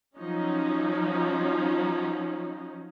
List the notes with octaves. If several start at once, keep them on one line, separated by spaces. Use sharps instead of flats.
F3 F#3 C#4 D#4